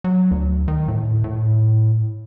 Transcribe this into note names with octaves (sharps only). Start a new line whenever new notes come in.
F#3
D2
D#3
A2
A2